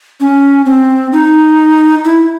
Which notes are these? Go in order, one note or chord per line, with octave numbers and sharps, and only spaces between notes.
C#4
C4
D#4
E4